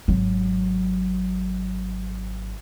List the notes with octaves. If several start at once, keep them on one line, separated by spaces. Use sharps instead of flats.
G#1 F#3